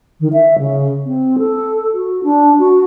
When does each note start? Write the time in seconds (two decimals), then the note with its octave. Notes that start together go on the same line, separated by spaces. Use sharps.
0.20 D#3
0.32 E5
0.58 C#3
1.05 C4
1.38 A4
1.93 F#4
2.23 D4
2.59 F#4